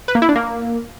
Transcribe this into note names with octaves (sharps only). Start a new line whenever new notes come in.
B4
A#3
E4
D4
A#3